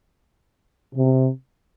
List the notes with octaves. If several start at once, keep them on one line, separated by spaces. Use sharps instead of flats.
C3